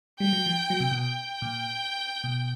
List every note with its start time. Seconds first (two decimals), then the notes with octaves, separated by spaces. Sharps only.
0.20 G3 G5
0.33 F#3
0.46 F3
0.70 F#3
0.80 C3
0.91 B2
1.01 G5
1.42 A#2
2.24 B2